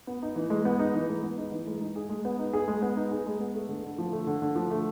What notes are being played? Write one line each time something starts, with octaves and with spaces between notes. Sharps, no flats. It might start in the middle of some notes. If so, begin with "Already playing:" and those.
B3
D#4
E3
G#3
B3
D#4
E3
G#3
B3
D#4
E3
G#3
D#4
G#4
G#3
B3
D#4
G#4
G#3
B3
D#4
G#4
G#3
B3
A3
D3
D3
F3
A3
D3
D3
F3
A3